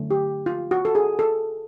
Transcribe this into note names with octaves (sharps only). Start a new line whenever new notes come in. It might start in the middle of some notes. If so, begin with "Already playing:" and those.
Already playing: D3 F#3 A3
G4
F4
F#4
A4
G#4
A4